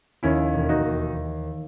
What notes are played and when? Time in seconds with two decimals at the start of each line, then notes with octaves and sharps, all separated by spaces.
0.23 D#2 C#4 E4
0.54 E1
0.69 D#4 F#4
0.85 D#2